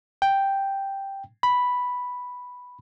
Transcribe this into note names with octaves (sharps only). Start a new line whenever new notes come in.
G5
B5